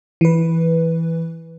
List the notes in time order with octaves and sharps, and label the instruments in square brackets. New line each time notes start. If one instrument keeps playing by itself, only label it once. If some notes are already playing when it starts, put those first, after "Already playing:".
[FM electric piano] E3 B4